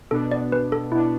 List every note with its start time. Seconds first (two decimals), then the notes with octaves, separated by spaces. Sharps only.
0.11 B2 B3 D4 A4
0.32 D5
0.52 B4
0.72 A4
0.91 B2 E4
0.95 B3 D4